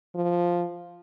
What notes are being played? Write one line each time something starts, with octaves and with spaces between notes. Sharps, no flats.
F3